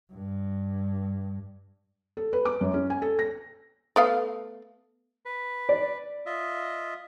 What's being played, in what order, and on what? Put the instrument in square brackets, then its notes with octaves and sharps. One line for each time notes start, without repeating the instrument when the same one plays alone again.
[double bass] G2
[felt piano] A4
B4
D6
F#2
C#4
G#5
A4
A#6
[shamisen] A3 B3 F5
[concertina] B4
[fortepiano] D5
[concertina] F4 D#5 E5